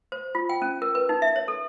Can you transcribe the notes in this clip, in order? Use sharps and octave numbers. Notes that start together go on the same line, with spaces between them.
C5
F4
G5
C#4
A#4
B4
D#4
E5
C#5
A4